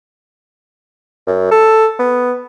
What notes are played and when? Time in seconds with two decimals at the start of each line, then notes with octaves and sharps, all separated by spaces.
1.27 F#2
1.51 A4
1.99 B3